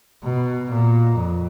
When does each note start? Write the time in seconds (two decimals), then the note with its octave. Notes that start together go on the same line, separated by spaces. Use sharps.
0.23 B2
0.69 A#2
1.16 F2